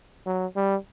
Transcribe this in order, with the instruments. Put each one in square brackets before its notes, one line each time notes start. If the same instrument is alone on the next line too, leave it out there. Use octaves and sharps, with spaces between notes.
[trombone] F#3
G3